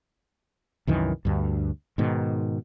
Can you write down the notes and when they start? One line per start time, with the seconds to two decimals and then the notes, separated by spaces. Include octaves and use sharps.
0.87 C2 F#2 D#3 E3
1.25 D2 G2
1.98 G#2 B2 D#3